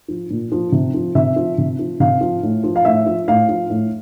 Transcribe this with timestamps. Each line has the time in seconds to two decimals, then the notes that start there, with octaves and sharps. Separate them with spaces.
0.08 F3
0.31 A#2
0.52 F3
0.72 C3
0.94 F3
1.15 C3 E5
1.36 F3
1.58 C3
1.79 F3
2.00 C3 F5
2.21 F3
2.43 A2
2.64 F3
2.76 F5
2.85 A2 E5
3.06 F3
3.28 A2 F5
3.49 F3
3.70 A2